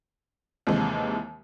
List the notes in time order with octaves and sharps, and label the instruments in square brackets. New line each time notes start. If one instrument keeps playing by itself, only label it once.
[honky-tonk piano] D#2 C3 E3 G#3